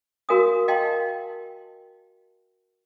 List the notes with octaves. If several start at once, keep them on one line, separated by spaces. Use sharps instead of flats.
F#4 A#4 C#5 F5 G#5 D#6
D#5 F5 G5 A5 C6